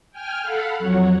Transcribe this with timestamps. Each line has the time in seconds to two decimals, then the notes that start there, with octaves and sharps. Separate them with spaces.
0.11 G5 G#5 F6
0.43 A4 F5 F#5 B5
0.78 F2 F#3 C#5 F#5